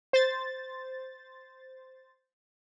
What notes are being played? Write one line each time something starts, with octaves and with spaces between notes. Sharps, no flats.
C5 A6